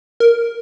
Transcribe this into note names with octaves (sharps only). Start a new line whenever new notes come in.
A#4